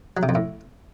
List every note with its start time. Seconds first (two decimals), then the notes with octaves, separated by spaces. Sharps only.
0.17 F#3
0.23 C3
0.29 F2
0.35 A2